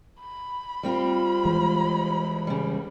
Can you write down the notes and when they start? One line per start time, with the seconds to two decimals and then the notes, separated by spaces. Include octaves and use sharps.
0.21 B5
0.83 G3 C4 F4
1.45 E3 G#3
2.47 C#3 G3